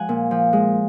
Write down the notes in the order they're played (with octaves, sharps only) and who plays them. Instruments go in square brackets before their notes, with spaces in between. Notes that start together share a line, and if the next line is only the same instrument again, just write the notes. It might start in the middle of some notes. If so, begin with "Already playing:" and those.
Already playing: [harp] F3 G#3 F#5 G#5
A#2
F3
G#3